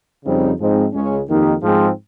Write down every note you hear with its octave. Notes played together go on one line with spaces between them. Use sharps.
F2 C#3 G3 C4 D#4
G#2 F3 G#3 C4 D#4
C#2 C#3 G#3 C#4
F2 D#3 A#3 D#4 G4
G#2 F3 G#3 C4